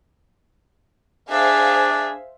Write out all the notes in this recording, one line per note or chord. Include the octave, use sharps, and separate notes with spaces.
D4 G#4 C5 E5 F5